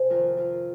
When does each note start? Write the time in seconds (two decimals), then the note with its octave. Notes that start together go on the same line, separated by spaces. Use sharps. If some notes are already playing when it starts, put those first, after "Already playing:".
Already playing: C3 G#4 C5
0.10 F2 D#3 F4 A#4
0.37 F4 A#4